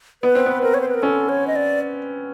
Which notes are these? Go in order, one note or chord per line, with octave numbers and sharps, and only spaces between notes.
B3 B4
C4
B3
C4 A#4
C#5
C5
B4
A#4
C#4 A4
C#5
D#5
D5